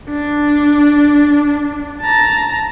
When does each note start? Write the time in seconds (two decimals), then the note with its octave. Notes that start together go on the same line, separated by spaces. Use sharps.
0.10 D4
2.02 A5 A#5